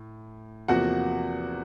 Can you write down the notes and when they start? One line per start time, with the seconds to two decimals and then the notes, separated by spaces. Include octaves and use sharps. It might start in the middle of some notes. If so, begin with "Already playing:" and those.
Already playing: A2
0.68 E2 C3 F3 A#3 F#4 F#5